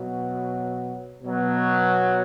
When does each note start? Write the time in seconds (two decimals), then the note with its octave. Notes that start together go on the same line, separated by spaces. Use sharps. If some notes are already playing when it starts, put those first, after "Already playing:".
Already playing: B2 F#3
1.22 B2 F#3